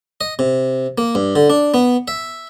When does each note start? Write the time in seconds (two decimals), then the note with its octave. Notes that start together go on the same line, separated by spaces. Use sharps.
0.21 D#5
0.39 C3
0.98 A#3
1.15 G2
1.36 D3
1.50 D4
1.74 B3
2.08 E5